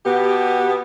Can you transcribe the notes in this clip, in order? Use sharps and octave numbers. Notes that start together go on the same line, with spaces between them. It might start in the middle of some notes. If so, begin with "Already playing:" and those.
B2 B3 G4